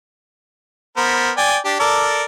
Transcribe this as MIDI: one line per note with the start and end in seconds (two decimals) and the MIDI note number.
0.97 1.31 59
0.97 1.31 70
0.97 1.31 72
1.37 1.57 74
1.37 1.57 79
1.37 1.57 80
1.65 1.79 62
1.65 1.79 67
1.80 2.24 69
1.80 2.24 70
1.80 2.24 74